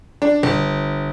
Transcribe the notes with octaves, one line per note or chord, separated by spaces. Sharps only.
D4
G1